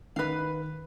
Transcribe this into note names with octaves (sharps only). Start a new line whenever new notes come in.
D#3 B4 F5 F#6